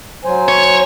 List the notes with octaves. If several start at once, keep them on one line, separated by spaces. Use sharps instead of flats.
F#3 C5 G#5
C#5